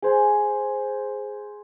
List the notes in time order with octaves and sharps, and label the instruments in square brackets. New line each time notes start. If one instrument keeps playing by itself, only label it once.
[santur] G#4 C5